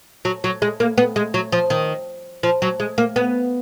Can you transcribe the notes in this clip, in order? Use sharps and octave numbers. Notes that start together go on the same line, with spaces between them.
F#3
F#3
G#3
A#3
B3
G#3
F#3
F3
D#3
F3
F#3
G#3
A#3
B3